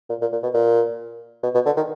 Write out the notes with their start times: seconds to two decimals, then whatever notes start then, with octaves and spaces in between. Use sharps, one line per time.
0.10 A#2
0.21 A#2
0.32 A#2
0.43 B2
0.54 A#2
1.43 B2
1.54 B2
1.66 D3
1.77 D#3